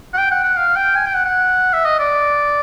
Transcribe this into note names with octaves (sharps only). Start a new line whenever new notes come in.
F#5
G5
F#5
F#5
F5
G5
G#5
G5
F#5
F#5
E5
D#5
D5